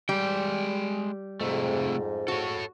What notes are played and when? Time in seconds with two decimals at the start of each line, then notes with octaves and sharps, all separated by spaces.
0.09 G3 G#3 G5
1.41 F2 G#2 C3 A3
2.28 F#4 A4 C#5